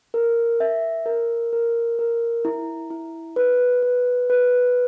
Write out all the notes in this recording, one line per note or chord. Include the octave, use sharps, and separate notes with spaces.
A#4
E5
A#4
A#4
A#4
E4
E4
B4
B4
B4